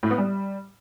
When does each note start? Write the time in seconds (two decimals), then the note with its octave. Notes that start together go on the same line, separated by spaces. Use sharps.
0.03 A2
0.11 B3
0.18 G3